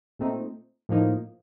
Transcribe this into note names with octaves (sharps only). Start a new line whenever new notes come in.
A#2 A3 C4 D#4
A2 F3 A#3 D#4